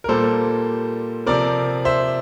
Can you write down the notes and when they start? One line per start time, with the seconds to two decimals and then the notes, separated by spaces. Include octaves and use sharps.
0.04 A#4
0.09 A#2 G3 A#3 A4 C5
1.26 C3 F3 C4 A#4 D5
1.85 C5 E5